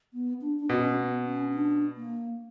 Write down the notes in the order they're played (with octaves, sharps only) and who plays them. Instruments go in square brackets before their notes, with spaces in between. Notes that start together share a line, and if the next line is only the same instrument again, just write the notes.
[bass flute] B3
D4
D4
[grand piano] B2 [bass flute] C#4
[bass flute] A#3
B3
C#4
D4
A#3